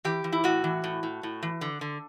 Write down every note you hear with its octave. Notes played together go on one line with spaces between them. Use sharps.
E3 G4
E3
E4
A2 F#4
E3
A2
A2
A2
E3
D3
D3